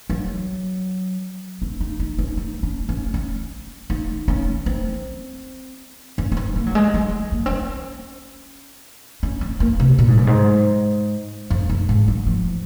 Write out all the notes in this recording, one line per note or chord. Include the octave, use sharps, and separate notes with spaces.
F#3
C4
D#4
D#4
C#4
D#4
C#4
C#4
C#4
D#4
C#4
C4
C#4
C#4
C4
A#3
F#3
G#3
F#3
A#3
C4
C#4
C#4
C4
A#3
C3
A#2
G#2
F#2
G#2
F2
F#2
G#2
F#3
F3